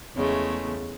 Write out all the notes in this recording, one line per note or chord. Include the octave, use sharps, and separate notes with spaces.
E2 C#3 G#3 A3